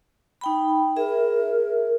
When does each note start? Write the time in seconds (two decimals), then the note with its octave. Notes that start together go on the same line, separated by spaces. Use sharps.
0.41 D#4 G5 B5
0.97 G#4 A#4 E5